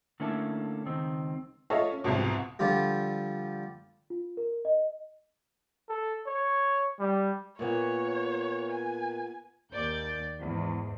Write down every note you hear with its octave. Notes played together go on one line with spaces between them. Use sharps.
D3 A3 A#3 C#4 E4 A4
C#2 D#3 C4
F4 A4 C#5 D#5 E5
C#4
C2 F2 G#2 B2
D3 F3 G3 D4 F4 G4
F4
A#4
D#5
A4
C#5
G3
A#2 A#3 B3 C#5
G#5
D#2 D5 G6
E2 G#2